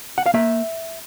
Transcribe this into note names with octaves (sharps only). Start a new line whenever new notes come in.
F#5
F5
A#3 E5